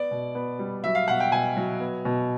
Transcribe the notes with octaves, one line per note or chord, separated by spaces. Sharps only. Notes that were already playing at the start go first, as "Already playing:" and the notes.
Already playing: B3 D5
B2
B3
G3
F#3 E5
F5
B2 F#5
G5
B2 G#5
F#3
B3
B2